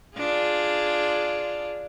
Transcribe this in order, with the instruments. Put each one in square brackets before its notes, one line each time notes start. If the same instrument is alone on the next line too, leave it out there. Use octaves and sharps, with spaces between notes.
[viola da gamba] D4 F4 G#4